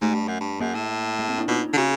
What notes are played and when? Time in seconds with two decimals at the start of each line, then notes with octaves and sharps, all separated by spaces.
0.02 G#2 A3
0.15 G2
0.28 F#2
0.41 G2
0.60 F#2 A#3
0.75 A2
1.19 A#3
1.29 C4
1.38 D4 E4
1.48 B2 D#4 F4
1.73 D3
1.77 C#3 F#4 G#4